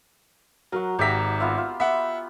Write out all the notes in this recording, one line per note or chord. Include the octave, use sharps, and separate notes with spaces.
F#3 F#4 A#4
G#1 G4 E5 A#5 B6
B3 F4 E5
F4
B3 E5 F#5